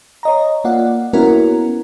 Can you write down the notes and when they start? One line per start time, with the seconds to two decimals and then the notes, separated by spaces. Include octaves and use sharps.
0.23 C#5 D#5 A#5
0.64 A#3 F4 D5 F#5
1.13 A#3 B3 C#4 E4 F#4 A#4